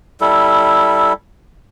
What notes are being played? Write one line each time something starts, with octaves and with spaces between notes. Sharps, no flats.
G3 E4 A4